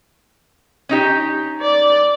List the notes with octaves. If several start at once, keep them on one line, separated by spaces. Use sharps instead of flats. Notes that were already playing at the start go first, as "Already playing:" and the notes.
C#4 D#4 G4
D5